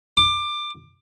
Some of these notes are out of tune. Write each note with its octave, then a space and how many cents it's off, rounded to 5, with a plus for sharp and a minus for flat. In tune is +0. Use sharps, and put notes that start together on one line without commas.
D6 +20